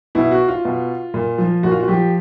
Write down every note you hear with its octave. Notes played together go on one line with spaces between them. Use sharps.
B2 E4
F#4
F4
B2
A#2
F3
A#2 F#4
F4
F#4
F3 G4